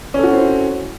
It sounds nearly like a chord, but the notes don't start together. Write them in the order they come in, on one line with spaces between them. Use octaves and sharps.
C#4 A4 F#4 E4 C4